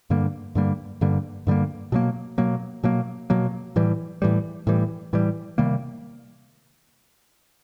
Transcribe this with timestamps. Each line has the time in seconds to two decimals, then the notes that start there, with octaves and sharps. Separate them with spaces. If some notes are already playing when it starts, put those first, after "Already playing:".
0.10 G2 D3 G3 A#3
0.55 G2 D3 G3 A#3
1.01 G2 D3 G3 A#3
1.47 G2 D3 G3 A#3
1.92 B2 F#3 A#3
2.38 B2 F#3 A#3
2.84 B2 F#3 A#3
3.30 B2 F#3 A#3
3.76 A2 E3 G3
4.22 A2 E3 G3
4.67 A2 E3 G3
5.13 A2 E3 G3
5.58 C3 D#3 G3 A#3